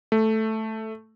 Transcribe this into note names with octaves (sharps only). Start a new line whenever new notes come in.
A3